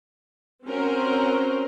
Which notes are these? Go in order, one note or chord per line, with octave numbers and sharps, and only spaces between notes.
C4 C#4 F#4 A#4 C5